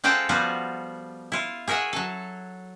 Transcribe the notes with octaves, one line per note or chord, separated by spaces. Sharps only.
G#3 C4 F4 A4 F#5 G5
F3 G3 B3 F4 F#4
E4 F4
G#4 A#4 C#5 E5 F#5
F#3 A4